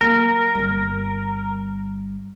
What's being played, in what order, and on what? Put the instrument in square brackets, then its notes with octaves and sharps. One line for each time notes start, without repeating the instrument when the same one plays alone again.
[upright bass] F#3 A#3 [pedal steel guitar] A#4
[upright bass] G1 G3